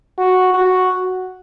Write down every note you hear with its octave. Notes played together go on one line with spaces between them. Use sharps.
F#4
F#4